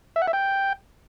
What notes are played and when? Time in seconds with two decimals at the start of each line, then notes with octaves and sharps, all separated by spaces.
0.16 E5
0.22 F#5
0.27 E5
0.33 G5